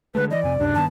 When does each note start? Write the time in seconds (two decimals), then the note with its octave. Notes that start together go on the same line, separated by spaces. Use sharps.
0.15 D3 G#3 A3 B4
0.31 E3 D5 D#5
0.44 F2 C3 G#5
0.59 C#2 F#2 C3 D4
0.75 G2 D#3 B3 A5